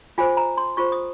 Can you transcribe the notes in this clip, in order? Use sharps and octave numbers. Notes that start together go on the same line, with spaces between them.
F4 G#4 C5 G#5
A#5
C6
F4 G#4 C5 C#6
D#6